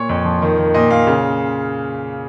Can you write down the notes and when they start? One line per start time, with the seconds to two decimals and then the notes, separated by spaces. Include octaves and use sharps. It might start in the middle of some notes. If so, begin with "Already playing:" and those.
Already playing: A#2 C#5
0.09 F2
0.25 F3
0.42 D#3
0.58 D#3
0.74 A#2 D#5
0.90 A#2 F5
1.07 C#3